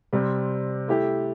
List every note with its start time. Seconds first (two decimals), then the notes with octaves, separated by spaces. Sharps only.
0.13 C3 G3 C4
0.88 A3 E4 G4